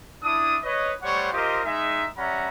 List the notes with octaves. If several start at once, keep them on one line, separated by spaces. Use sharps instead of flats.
D4 E4 D#6
B4 C#5 D#5
G3 A3 C5 C#5 F#5 C#6
F4 G4 A#4 C5 D#5
G#3 D#4 E5
G3 C#4 E5 F#5 A#5 B5